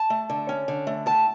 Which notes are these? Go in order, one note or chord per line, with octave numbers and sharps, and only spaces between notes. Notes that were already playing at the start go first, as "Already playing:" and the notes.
Already playing: A5
A3
D3
C#4
D3
A3
A2 A5